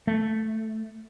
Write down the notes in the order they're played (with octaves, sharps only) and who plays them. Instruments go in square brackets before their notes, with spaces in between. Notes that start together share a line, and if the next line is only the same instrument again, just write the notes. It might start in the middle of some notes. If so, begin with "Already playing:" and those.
[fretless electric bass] A3